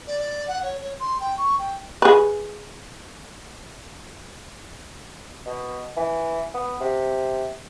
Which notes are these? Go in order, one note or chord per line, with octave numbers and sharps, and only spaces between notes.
D5
D5
F#5
C#5
C#5
C6
G5
C#6
G5
G#4 B4
B2
E3
B3
C3